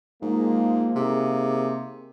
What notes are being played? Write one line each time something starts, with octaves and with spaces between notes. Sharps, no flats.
G#2 F3 G#3 A#3
C3 A#3 D#4 G#4